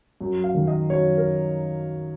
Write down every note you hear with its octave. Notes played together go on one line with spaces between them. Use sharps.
F#2
F5
D#3
D#5
F#2 C#5
A#4